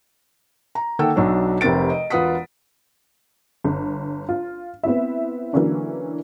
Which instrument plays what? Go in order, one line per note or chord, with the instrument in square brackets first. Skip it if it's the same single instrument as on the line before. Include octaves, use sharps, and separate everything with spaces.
[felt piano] A#5
D#3 A#3 A4 F#5 G5 E6
B1 F#3 D4
F1 C3 C4 A#4 A6 D7
D#5
E1 F4 B4 F#5 D#6 B6
[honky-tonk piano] G1
F4
B3 C4 E4 E5
D3 E3 F#3 A#3 C#4 D4